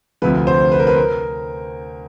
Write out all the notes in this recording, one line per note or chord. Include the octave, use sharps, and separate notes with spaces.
D2 C3 F3 B4
C5
B4
A#4
B4
A#4